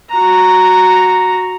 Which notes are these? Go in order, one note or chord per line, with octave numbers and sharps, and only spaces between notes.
F#4 A#5